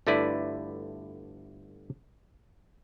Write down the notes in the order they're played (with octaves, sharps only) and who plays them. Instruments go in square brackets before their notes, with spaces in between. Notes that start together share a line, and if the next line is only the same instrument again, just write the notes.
[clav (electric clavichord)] G1 D3 A3 E4 B4 D5